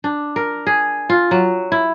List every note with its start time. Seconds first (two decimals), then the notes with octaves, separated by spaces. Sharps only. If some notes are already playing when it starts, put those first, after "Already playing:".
0.04 D4
0.36 A#4
0.67 G#4
1.09 F4
1.31 F#3
1.72 E4